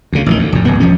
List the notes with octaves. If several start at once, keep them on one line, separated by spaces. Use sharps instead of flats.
D2 C#3
A1 D3 D#3
D2
F1 A2
D1 F#2 B3
E1 F3 C#4